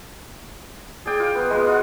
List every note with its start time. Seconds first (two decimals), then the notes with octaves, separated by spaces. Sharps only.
1.06 G#4 D5 G5
1.20 F4
1.35 B3
1.50 G#3 B3 F4
1.67 F4 F#5